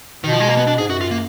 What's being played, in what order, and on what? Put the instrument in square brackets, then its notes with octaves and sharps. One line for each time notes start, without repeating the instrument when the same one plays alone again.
[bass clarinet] B2 [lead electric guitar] D#3
[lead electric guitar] F3
G#3
A#3
B3
D4
[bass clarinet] G#2 [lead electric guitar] G#4
[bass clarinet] F#2 [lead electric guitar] F#4
[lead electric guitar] F4
A#3